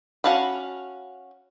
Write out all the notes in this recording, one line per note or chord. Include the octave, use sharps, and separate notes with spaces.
C#4 F#4 F5 A5 B5